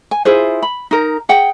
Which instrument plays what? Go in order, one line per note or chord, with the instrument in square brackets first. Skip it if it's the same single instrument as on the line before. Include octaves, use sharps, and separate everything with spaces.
[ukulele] G#5
E4 F4 G#4 C5
B5
D#4 A#4
G#4 F#5 G5